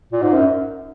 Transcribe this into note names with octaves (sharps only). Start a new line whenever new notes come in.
A#2
G#2
F#2